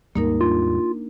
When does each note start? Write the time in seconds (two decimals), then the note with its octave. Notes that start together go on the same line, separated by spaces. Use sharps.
0.15 D#2 G#2 G3 A#3 D#4 A#4
0.41 D4 F4